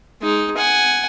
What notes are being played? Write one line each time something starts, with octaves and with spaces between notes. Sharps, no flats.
G#3 D#4
F#5 G#5